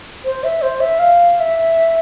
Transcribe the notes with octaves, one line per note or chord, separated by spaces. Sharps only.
C5
E5
C5
E5
F5
F5
E5